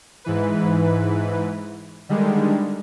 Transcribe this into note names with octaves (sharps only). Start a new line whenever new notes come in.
G#2 E3 B4
D3 D#3 G3 G#3